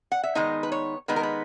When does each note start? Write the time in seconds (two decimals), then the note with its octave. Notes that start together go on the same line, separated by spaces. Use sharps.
0.12 F#5
0.23 E5
0.35 D#3 G#3 B3 D#4 D#5
0.63 B4
0.72 C#5
1.08 D#3 G#3 B3 D#4 B4
1.16 A#4
1.23 B4